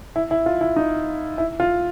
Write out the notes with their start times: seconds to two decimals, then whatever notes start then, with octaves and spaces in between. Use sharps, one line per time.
0.16 E4
0.31 E4
0.46 F4
0.61 E4
0.76 D#4
1.38 E4
1.60 F4